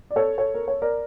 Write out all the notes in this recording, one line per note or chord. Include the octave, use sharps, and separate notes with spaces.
D5
A4 C#5
A4 C#5
A#4
C#5
A#4 D5